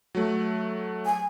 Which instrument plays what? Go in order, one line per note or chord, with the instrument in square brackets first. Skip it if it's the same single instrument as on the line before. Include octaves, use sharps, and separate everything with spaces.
[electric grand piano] F#3 A3
[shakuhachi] G#5